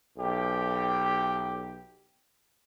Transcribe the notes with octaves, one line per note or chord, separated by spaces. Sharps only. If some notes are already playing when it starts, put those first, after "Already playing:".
B1 G4